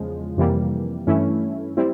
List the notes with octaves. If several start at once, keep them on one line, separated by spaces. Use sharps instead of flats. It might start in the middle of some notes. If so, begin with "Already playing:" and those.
Already playing: E2 C#3 F3 G#3
F2 C3 E3 G3 A#3
G2 E3 A3 C#4 E4
G3 C4 E4